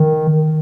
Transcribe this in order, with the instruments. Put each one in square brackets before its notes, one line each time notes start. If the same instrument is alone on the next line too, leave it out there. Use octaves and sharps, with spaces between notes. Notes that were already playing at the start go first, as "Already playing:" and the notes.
Already playing: [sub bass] D#3